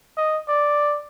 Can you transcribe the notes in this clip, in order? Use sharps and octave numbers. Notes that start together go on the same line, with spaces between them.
D#5
D5